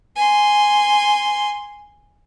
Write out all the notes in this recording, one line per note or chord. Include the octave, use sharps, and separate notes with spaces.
G#5 C6